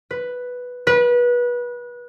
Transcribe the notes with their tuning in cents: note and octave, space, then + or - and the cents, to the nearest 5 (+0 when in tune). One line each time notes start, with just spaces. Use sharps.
B4 +0
B4 -25